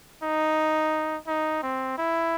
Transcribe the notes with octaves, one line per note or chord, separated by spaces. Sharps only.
D#4
D#4
C4
E4